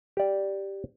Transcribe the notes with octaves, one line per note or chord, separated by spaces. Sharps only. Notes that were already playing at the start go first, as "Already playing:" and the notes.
G4 D5